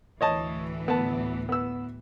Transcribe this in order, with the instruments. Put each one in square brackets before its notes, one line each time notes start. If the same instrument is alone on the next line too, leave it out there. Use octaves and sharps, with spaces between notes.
[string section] D2 A2 E3 [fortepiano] C#5 D#5 A5
[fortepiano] B3 A5
B3 E6